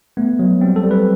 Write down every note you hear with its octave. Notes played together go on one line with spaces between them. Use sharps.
A3 B3
F#3
G3 C4
A4
G3
B4